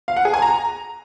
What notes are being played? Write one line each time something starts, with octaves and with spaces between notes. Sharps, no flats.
F5
F#5
G#4
G#5
A#5